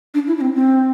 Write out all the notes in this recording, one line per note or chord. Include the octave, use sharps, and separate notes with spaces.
D4
E4
D4
C4
C4